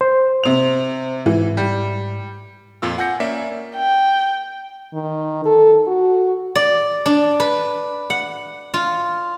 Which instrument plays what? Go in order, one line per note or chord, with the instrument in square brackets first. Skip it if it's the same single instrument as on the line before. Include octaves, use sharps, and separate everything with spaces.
[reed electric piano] C5
[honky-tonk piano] C3 F7
[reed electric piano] G#2 [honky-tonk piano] E3
[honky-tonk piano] G3
[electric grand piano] F2 A#2 F4 E6
F#5 G#5 E6 G6 A#6 C#7
A#3 C#4 D5 E5 B6
[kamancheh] G5
[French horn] D#3
A4
F#4
[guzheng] D5
D4
B4
F#5
F4